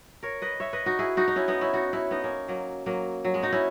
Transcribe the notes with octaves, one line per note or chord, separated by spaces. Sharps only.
A#4 C#5
B4 D#5
C#5 E5
B4 D#5
D#4 F#4
E4 G#4
D#4 F#4
D#4
C#4 E4
B3 D#4
C#4 E4
D#4 F#4
C#4 E4
B3 D#4
A#3 C#4
F#3 A#3
F#3 A#3
F#3
G#3
D#4 F#4
C#4 E4